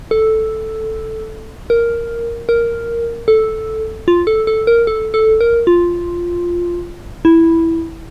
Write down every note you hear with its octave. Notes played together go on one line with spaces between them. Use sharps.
A4
A#4
A#4
A4
F4
A4
A4
A#4
A4
A4
A#4
F4
E4